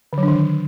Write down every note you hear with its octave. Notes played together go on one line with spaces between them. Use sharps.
D3
F#3
D4
D#3